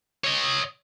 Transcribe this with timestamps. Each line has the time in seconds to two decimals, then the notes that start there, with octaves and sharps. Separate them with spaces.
0.24 C#5 D#5